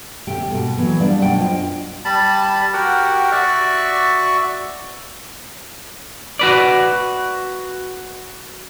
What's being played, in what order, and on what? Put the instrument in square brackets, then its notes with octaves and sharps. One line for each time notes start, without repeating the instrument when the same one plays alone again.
[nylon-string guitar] D#2 C3 A3 G4 G5
G#2 B2 A#3
A#2 E3 F#3 B3
G3 A3 B3 D4 D5 F5
F#2 B2 D4 F#5 G5
F4 C5 D#5 G5
[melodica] G3 A5 B5
F#4 G4 A#4 F#5
F#4 D5 E5 C#6
[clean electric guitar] F#4 B4 D5